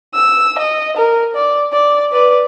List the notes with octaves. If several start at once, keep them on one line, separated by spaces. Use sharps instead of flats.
E6
D#5
A#4
D5
D5
B4 D5